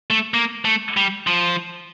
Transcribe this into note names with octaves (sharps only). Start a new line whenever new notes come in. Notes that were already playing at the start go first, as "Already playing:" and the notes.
A3
A#3
A3
G3
F3